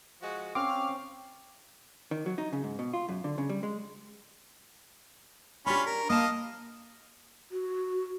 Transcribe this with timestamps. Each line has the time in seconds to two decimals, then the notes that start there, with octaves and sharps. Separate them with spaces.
0.21 F3 G#3 F#4
0.55 C4 C#4 F5 D6
2.11 D#3
2.26 F#3
2.38 D#4
2.52 C#3
2.64 G#2
2.79 B2
2.93 F4
3.09 F#2
3.24 D3
3.38 C#3
3.49 G3
3.63 G#3
5.66 C#4 D4 F4 G4 B5
5.86 A#4
6.10 A#3 D#5 F5 A5
7.52 F#4